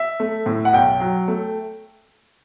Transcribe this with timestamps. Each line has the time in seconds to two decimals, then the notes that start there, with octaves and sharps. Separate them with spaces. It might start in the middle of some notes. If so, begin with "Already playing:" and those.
Already playing: E5
0.20 A3
0.46 A2
0.65 F#5
0.73 B1 G5
1.00 F#3
1.28 A3